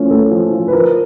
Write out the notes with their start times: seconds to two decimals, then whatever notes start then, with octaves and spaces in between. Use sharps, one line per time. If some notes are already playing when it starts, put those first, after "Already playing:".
Already playing: F3 A3 C#4
0.11 A3 A4
0.31 F3
0.53 F3
0.68 B4
0.72 F3 A#4